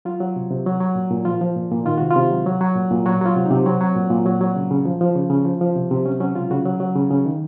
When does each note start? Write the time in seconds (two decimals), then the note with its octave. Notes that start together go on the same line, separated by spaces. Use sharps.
0.05 F#3 F4
0.20 F#3
0.36 C3
0.50 C3
0.66 F#3
0.81 F#3
0.95 A#2
1.10 A#2
1.25 F3 F4
1.41 F3
1.56 A#2
1.71 A#2
1.85 D#3 F4
1.98 C3 F#4
2.11 F4
2.16 C3
2.30 F#3
2.46 F#3
2.61 F#3
2.76 A#2
2.91 A#2
3.06 F#3 F#4
3.21 F#3 F4
3.36 C3
3.46 D#4
3.51 C3
3.66 F#3 C4
3.81 F#3
3.95 A#2
4.10 A#2
4.26 F#3
4.41 F#3
4.56 C#3
4.71 C#3
4.85 F3
5.01 F3
5.15 C#3
5.30 C#3
5.45 F3
5.61 F3
5.76 C3
5.91 C3
6.05 F#3 C#4
6.20 F#3 C#4
6.35 C#3 F4
6.51 C#3 F#4
6.65 F#3
6.80 F#3
6.96 C#3
7.10 C#3
7.26 D#3